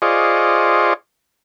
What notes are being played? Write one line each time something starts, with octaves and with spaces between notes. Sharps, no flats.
F4 G#4 C5 D5 D#5 C#6